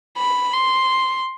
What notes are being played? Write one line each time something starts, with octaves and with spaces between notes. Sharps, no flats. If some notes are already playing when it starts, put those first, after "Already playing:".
B5
C6